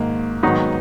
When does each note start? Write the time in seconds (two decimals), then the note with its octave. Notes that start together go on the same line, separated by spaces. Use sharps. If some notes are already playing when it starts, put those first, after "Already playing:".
Already playing: G#2 D#3 A#3
0.43 G#2 D#3 F#3 B3 D#4